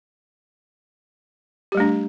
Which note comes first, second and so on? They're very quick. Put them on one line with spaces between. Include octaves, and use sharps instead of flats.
G4 G3 A3 D4